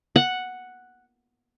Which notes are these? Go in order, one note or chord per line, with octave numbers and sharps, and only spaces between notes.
F#5